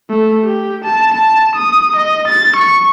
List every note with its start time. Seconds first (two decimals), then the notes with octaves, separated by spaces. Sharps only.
0.10 A3
0.45 G4
0.84 A5
1.14 A5
1.55 D#6
1.96 D#5
2.28 A6
2.56 C#6